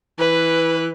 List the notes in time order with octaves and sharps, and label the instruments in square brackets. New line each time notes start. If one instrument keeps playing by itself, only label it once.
[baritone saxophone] E3 [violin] B4